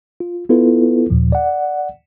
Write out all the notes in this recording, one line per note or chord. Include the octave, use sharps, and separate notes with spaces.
F4
B3 E4 F4 A4 B4
D#2 A#2 F3
D5 F#5